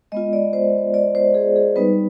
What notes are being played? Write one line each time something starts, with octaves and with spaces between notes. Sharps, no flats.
G#3 B3 F4 D#5
D5
C5
D5
C5
G#4
G#4
G3 B3 D#4 B4